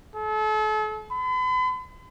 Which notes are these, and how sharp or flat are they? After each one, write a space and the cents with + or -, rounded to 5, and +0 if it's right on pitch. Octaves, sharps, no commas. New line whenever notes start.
A4 -40
B5 +45